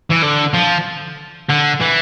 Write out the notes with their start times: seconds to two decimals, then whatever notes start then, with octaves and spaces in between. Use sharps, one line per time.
0.10 E3
0.22 D3
0.54 F3
1.49 D3
1.80 E3